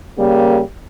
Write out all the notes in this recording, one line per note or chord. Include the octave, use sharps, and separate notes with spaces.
C#3 G3 A#3